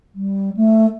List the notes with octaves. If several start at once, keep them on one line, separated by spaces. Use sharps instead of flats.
G3
A3